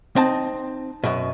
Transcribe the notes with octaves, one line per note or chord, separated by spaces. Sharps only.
C4 D#4 A5
F#2 B2